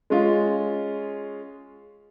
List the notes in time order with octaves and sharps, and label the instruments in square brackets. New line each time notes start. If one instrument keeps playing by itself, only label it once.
[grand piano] G#3 C#4 F4